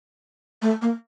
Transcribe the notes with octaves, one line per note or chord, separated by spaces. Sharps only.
A3
A#3